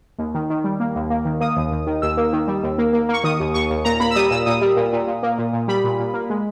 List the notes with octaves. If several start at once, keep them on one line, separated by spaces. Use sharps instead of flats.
D#2
D#3
D#3
G3
A#3
D#2
A#3
D#3
A#3 D#6
D#2
D#2
D#3
D#2 E6
A#3
D#3
G3
D#2
A#3
A#3
A#3 C#6
D#3 D#6
D#2
D#2 C#6
D#2
A#2 A#5
A#3 B5
E6
G3 D#6
A#2 E6
A#2 D#6
G3
A#2
A#2
A#2
A#3
A#2
A#2
G3 B5
A#2
A#2
A#3
G#3